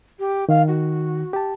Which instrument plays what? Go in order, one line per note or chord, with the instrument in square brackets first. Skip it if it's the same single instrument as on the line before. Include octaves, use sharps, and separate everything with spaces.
[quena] G4
[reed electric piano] D#3 [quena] F5
[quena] F#4
[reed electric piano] G4 A5